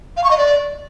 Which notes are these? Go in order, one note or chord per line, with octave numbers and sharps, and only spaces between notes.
F5
C#6
D#5
D5